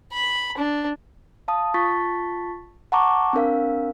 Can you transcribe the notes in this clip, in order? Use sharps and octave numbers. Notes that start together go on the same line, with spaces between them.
B5
D4
F5 A5 D#6
F4 A5 C#6 A6 B6
F#5 A5 A#5 C#6 D6
C4 D4 A#4 F5